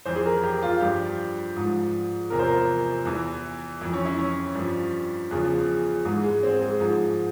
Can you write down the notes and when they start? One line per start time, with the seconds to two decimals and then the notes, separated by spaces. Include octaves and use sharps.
0.05 F2 E3 C5
0.16 G#4
0.25 A#4
0.43 G4
0.63 F4
0.81 G2 F3 G4
1.56 G#2 F3
2.30 E2 C3 F3 A#4
2.39 C5
2.46 A#4
3.05 E2 E3
3.81 F2 E3 E4
3.93 C#4
4.05 E4
4.19 C#4
4.55 G2 F3
5.31 E2 C#3 F3
6.05 G#2 E3 G#3
6.23 G#3
6.43 C4
6.61 G#3
6.80 G#2 F3